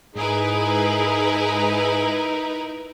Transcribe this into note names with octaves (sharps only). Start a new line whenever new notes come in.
G#2 D#4 E4 G#4 A#4 B4